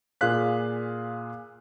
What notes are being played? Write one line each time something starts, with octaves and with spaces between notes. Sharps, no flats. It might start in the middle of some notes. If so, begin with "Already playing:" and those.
A#2 F4 G#4 F5 F#6 B6